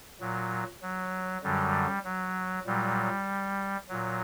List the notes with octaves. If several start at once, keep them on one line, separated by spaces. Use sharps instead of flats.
A#2 F#3
F#3
F#2 D3 F#3 G3
F#3
A#2 F#3 G3
A#2 F#3